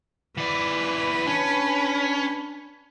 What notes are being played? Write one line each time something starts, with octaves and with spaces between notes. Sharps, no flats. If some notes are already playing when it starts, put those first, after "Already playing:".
E3 B4 D5
C#4 D4